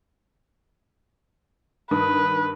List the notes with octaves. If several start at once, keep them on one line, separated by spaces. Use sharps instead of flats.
G2 D#3 B4 D#6